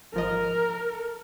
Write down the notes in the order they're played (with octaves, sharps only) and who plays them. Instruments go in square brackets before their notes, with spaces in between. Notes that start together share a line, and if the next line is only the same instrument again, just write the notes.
[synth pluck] G#1 F3 D#5 [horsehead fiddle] A#4